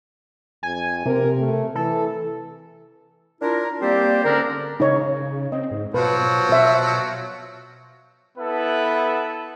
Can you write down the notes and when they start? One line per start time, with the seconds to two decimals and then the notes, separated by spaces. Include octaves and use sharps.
0.63 F2 G#5
1.05 C3 A#4
1.39 A3
1.75 E3 A4
3.42 D4 E4 F4 A#4
3.81 G3 A#3 C4 G4 C5 D5
4.24 G#2 D3 C#4 D4 A#4
4.80 C#3 D#4 C#5
5.52 C4 D#5
5.71 G#2
5.94 B2 F3 F#3 B4
6.49 B2 C5 E5
8.38 B3 E4 A4 B4